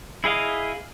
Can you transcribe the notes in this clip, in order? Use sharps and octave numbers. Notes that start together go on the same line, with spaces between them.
E4 G#4 D#5 F5